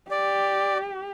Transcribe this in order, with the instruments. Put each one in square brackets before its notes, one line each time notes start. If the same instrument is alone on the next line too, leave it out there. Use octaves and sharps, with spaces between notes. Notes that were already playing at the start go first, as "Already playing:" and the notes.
[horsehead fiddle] G4 [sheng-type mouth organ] D5